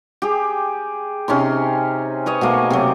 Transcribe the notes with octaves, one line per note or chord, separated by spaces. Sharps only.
G4 G#4
C3 C#4 D#4 C6
B4 C#5 D#5
B2 A3 A#3
C3 F#3